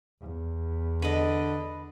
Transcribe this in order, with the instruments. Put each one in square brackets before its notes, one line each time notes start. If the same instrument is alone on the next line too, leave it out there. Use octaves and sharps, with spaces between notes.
[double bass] E2
[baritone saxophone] D3 [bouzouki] B4 D#5